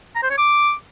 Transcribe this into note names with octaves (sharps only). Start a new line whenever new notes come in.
A#5
C5
C#5
D6